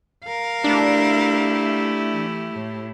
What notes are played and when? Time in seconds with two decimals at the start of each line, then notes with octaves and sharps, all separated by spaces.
0.24 A#4 F5
0.64 A3 D4 E4 G4
2.11 E3
2.52 A2